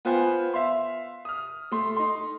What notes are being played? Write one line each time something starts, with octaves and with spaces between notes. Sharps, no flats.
B3 F4 B4 C5 G5 G#5
E5 F5 C6
D#6 F6
A3 C6
D#4 C6